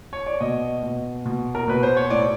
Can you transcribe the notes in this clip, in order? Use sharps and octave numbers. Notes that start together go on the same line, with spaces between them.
C#5
D5
B2 D#5
B2
B2
A#4
B2 B4
C5
C#5
A2 D5